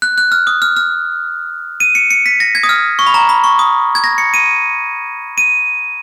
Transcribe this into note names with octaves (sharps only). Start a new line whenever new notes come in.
F#6
F#6
F6
D#6
F6
F6
D#7
C#7
C#7
B6
A#6
G#6
D#6
F6
C#6
B5
A#5
B5
C#6
D#6
G#6
A#6
C#7
D#7
D#7